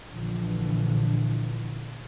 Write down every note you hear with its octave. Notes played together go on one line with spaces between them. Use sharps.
A#1 D3 E3 F3